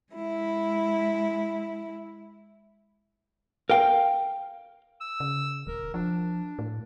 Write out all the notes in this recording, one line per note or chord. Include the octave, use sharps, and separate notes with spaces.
G#3 E4
A#4 F5 G5
E6
C#3
D#1 A#4
F3 D4
A2